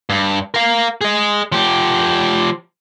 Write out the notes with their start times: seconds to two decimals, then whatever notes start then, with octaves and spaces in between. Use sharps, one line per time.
0.10 G2
0.54 A#4 F5
1.01 G#4 D#5
1.52 F3 G4